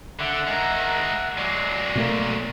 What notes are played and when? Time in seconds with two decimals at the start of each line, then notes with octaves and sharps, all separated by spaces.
0.19 D3 E5 F#5
0.47 G#3 A#4
1.37 F#3 G#3 D5
1.95 B2 A3 A#3